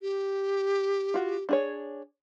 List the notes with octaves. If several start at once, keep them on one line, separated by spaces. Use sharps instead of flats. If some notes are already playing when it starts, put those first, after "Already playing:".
G4
F4 F#4
D4 G#4 C#5